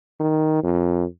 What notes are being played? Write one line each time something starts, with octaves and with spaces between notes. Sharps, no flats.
D#3
F2